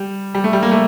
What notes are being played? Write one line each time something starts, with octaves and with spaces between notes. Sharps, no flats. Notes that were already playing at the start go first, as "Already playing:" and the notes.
Already playing: G3
G3
A3
G3
A#3
A3